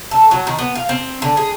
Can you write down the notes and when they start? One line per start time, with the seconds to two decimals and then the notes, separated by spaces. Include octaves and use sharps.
0.11 A4
0.31 F#3
0.47 D#3
0.59 B3
0.75 F5
0.89 C4
1.22 D3
1.37 G#4